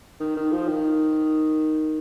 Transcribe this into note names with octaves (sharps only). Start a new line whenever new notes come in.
D#3
D#3
F3
D#3